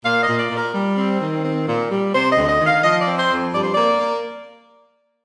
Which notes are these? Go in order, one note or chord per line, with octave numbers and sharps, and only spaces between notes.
A#2 F5
D#5
A#2
D5
A#2
A#4
G3
C4
D#3
C4
A#2
G3
C3 C5
D#5
D2
D#5
D#3
F5
F3 D#5
D5
C4
C5
F2
G2 D5
C5
A#3 D5
A#3